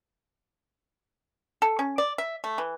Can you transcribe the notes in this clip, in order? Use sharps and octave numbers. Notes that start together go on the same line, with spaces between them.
A4
C#4
D5
E5
A3
E3